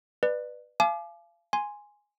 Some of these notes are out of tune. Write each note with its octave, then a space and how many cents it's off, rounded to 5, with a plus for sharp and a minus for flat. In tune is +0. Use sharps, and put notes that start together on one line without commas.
B4 +0 D5 +30
F5 -30 G#5 +45 D6 +20
G#5 +0 C6 +0